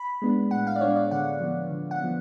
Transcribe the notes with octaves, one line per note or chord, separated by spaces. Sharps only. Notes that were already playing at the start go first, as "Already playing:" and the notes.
Already playing: B5
G#3 B3 D4
A2 F#5
F5
D5
G#3 B3 D4 C#5
D5
D3 F#5
F3 B3
D3
F#5
F3 B3